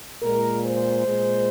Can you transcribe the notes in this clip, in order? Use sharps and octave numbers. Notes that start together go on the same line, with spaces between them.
A#2 G#3 A#4
C5
A#2 G#3